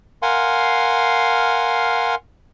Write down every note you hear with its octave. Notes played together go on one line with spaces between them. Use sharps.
A#4 F5 F#5 G#5 C6